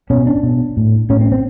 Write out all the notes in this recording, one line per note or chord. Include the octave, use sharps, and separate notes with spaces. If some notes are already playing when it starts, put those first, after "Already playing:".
B2 C#4
D4
B2
A2
A2 C#4
C4
C4